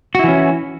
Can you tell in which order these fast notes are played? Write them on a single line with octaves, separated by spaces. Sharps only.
F#4 E4 E3 C#4